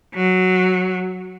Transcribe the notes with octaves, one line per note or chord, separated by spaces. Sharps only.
F#3